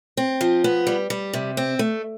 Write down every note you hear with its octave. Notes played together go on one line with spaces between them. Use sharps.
C4
F3
B3
G3
G3
C3
C4
A3